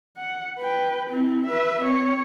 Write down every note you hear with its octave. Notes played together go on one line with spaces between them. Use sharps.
F#5
B4 G5
C4 E4
B4 E5
C4 C#5